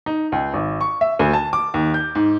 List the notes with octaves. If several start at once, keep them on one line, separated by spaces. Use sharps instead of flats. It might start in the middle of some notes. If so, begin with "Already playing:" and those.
D#4
C#2
G#1
C#6
E5
D2
A5
D6
D#2
G6
G#2